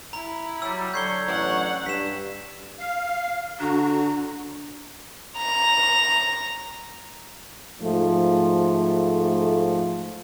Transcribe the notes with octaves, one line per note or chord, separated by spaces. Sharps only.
E4 A#5
F#3 G3 E6
D3 F#3 C#5 G6 C7 G7
A1 F#5
G2 B6 E7
F5
D3 D4 F#4 A#5
A#5 F7
G#2 F3 A3